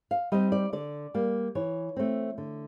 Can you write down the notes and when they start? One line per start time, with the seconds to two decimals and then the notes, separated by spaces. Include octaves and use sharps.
0.11 F5
0.32 G3 C4 D#4 D#5
0.52 D5
0.73 D3 D5
1.14 G3 A#3
1.55 E3 C#5
1.96 A3 C4
2.38 D3